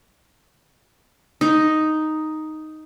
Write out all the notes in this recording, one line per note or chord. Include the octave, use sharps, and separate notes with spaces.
D#4